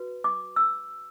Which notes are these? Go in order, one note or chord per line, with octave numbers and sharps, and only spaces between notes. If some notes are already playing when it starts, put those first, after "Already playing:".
Already playing: F#4 B4
D6
E6